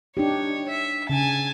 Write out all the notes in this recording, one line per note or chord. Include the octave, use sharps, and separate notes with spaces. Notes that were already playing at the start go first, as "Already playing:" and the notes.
D4 D#4 G4 C#5
E5
C#3 G#5 A5